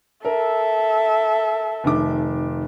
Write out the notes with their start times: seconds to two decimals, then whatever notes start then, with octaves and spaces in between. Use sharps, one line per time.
0.25 A4 A#4 E5
1.84 F1 D#3 D6